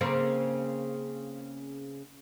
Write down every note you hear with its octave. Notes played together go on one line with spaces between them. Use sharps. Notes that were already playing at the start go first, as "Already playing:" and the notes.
C#3 A#3 C4